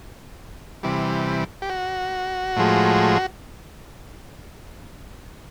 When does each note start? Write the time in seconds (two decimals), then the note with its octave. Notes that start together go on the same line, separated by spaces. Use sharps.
0.83 C3 E3 G3
1.62 G4
1.70 F#4
2.56 A2 F3 G#3